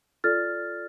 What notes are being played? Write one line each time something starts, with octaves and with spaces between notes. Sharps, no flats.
F4 A4 D5 F6 A6